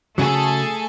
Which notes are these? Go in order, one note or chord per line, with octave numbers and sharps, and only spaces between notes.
C#3 F#3 A3 G#4 A4